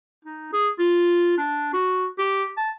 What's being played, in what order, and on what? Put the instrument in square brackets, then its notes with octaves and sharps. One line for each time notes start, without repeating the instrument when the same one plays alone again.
[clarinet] D#4
G#4
F4
D4
F#4
G4
A5